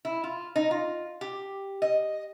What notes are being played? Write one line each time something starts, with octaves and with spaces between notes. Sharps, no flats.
E4
F4
D#4
F4
G4
D#5